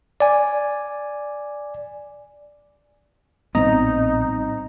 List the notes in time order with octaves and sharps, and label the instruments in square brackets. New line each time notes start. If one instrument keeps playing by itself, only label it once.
[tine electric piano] D5 G#5
[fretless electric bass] A#1 G3 B3 [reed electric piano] A2 C4 [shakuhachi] D#4 [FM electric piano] D#5 A#5